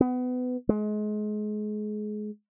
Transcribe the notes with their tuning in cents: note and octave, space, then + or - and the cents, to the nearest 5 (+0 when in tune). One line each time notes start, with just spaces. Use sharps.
B3 +25
G#3 +30